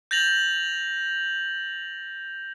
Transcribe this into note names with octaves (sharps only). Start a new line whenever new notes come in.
G6 A6 A#6 F7 F#7